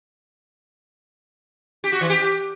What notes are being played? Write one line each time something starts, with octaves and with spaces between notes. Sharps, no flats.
G4
F#4
E3
G4